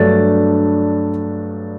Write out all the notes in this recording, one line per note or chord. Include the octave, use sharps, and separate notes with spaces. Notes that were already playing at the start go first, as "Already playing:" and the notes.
Already playing: G2 F#3 A3 D4 A6